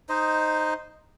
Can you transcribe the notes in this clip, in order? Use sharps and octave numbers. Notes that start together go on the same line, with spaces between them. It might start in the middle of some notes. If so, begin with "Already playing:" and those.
D#4 C5 D#5